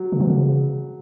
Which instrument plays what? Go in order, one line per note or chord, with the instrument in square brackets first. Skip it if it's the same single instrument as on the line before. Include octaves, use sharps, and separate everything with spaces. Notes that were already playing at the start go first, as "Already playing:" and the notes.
Already playing: [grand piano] F#3
[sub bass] C#3
E3
C#3